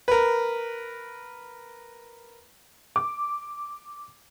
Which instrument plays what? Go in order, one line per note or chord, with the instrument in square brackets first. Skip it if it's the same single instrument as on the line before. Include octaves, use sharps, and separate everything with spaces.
[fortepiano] A#4 B4
[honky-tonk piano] D6